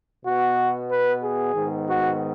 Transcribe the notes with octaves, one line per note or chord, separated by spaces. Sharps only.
B2 B3 F#4
B4
G#4
G#2 D#3 B3
F#4